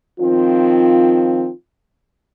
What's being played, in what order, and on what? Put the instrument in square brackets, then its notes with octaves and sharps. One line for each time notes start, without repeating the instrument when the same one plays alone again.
[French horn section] D#3 F3 C4 [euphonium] F4